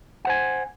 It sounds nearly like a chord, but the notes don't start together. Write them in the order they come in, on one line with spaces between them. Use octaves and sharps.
F#5 C5 G#5